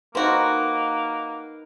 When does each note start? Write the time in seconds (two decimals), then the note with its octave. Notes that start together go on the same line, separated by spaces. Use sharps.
0.15 A#3 C4 D#4 F#4 A#4 B4